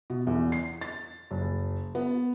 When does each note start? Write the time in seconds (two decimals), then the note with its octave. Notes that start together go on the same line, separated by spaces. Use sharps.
0.10 B2
0.27 E2
0.52 C7
0.81 A6
1.31 F#1
1.95 B3